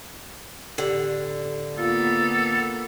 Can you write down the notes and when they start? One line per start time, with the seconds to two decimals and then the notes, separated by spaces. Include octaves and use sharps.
0.78 A2 D3 G4
1.78 A#3 B3 F4 A4 F5